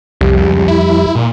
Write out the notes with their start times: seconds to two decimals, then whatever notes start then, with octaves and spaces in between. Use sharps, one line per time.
0.21 C2 F2 G3
0.41 C#2
0.68 E4
1.15 A#2